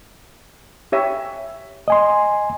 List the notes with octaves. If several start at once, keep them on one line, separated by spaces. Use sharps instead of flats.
G4 C#5 E5
D#5 G#5 C6